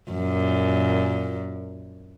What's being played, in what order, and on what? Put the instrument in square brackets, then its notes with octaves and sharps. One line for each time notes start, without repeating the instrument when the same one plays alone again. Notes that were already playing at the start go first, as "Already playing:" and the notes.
[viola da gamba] F#2 A#2